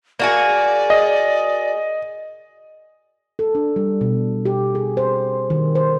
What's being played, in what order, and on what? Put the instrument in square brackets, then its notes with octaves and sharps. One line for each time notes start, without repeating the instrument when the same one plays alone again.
[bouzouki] A#3 F#4 G#4 [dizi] D5
[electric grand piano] D#5
[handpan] A4
D4
G3
B2
G4
G#4
C5
D#3
C5